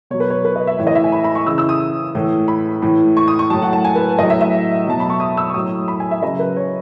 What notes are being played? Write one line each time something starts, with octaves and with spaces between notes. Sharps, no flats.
B2 F#3 C#5
B4
C#5
B4
D#5
E5
A2 E3 C#5
D#5
E5
G#5
B5
B5
C#6
C#3 E3 E6
E6
D#6
A2 E3
B5
A2 E3
C#6
D#6
C#6
A2 F#3 A5
F#5
A5
G#5
B4
A2 F#3 D#5
E5
E5
B2 F#3 A5
B5
C#6
D#6
E6
C#6
A2 F#3 D#6
B5
G#5
E5
C#3 F#3 D#5
B4
C#5